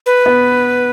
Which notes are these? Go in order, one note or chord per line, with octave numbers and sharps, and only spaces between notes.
B4
B3